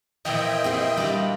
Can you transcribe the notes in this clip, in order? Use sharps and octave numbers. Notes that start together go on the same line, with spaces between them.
A#2 E3 F3 D#5 E5 G5
C4 G#4 F#5
G3 D4 F4 F#4